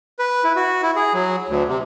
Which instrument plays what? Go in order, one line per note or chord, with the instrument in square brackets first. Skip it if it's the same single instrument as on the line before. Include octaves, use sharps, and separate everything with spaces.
[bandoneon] B4
E4
F#4
E4
G#4
F#3
D2
C3